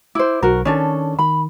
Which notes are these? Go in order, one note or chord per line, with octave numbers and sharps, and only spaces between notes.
E4 C5 D6
B1 F#4 A#4
D#3 C#4 D4 A4 C#5
D#3 B5